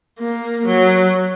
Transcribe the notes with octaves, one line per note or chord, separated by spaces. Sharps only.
A#3
F#3